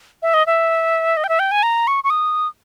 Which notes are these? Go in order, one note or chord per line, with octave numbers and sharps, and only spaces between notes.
E5
D#5
E5
D#5
G5
E5
G5
G#5
A#5
C#6
C#6
D#6